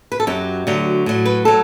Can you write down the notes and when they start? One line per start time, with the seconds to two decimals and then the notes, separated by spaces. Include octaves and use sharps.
0.12 B4
0.20 A4
0.27 F#2 F#3 G4
0.67 D2 D3 F#3
1.06 A2 F#3
1.25 B4
1.45 F#3 A4